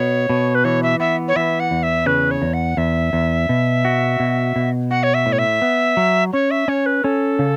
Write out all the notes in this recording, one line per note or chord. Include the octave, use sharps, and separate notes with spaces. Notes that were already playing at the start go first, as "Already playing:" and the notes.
Already playing: B2 C#5
B2
B4
E3 C#5
E5
B3 E5
C#5
E3 E5
F#5
E2
E5
C#3 B4
C#5
E2
F#5
E2 E5
E2
B2
F#4
B2
B2
F#4 F#5
C#5
E5
A2
C#5
E5
B3
F#3
C#4 C#5
E5
C#4 C#5
B4
C#4 A4
C#3